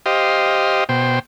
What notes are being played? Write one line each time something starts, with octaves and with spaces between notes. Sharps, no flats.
G4 C5 D#5 F5
B2 C5 G5